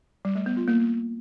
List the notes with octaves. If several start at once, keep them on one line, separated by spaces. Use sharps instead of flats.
G3
A3
B3
F4
A#3